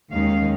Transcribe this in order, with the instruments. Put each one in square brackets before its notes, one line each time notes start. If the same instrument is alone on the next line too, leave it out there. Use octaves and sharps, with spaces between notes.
[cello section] D#2 D#3 G#3 C#4 F5